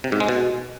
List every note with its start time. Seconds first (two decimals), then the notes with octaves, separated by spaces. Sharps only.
0.04 C3
0.12 G#2
0.20 G#3
0.28 B2